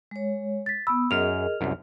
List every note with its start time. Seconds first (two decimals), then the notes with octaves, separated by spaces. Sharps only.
0.11 G#3 C#5
0.66 A6 B6
0.87 B3 B5 D#6 E6
1.11 F#2 G#4 A#4 D#5 F6 F7
1.61 C2 F#2